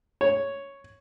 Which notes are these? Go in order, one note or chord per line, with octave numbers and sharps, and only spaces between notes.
C#5